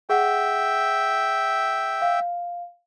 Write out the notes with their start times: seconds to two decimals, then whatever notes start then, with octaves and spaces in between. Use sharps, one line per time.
0.10 G#4 E5 F#5 G5
2.02 F5